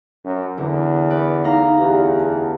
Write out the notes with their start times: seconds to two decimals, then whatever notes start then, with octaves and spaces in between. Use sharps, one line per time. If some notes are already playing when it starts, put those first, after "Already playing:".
0.25 F#2
0.58 E2 D3
1.10 F#4 B4 D5
1.45 D2 D#4 F5 A#5
1.78 E2 G4 G#4
2.20 A5